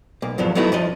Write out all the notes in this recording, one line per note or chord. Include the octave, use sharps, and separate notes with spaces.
B1 A#3
E2 G2 F3 F#3
F#3 A3 B3 D#4 E4 F#4
F#2 F3 D#5